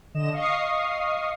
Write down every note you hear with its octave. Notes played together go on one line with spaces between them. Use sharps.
D3 D#5 E7
D#5 F5 C#6 D#6 C7